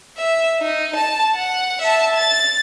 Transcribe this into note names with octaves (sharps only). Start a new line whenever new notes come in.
E5
D#4
A5
F#5
E5 A5
A6